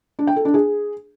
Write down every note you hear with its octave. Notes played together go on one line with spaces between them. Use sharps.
D4
G5
A4
D4
G#4